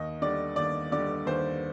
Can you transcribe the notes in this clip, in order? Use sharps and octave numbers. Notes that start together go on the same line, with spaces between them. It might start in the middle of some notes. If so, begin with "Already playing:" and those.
Already playing: D#2 D#5
D3 G3 D5
D#2 D5
D3 G3 D5
D#2 C5